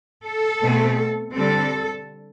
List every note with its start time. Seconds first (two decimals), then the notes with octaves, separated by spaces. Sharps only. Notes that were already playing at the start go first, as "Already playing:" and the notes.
0.25 A4
0.61 B2 A3 C4
1.35 D3 G3 C4 A4